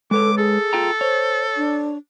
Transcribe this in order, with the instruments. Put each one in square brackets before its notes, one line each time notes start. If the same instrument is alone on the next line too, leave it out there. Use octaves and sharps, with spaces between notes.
[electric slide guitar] G#3 B4 C#5 [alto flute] A4 [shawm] D6
[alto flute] G#4 [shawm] A4
[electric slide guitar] F4 G5 A#5
[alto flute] C5 [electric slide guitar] C#5
[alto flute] D4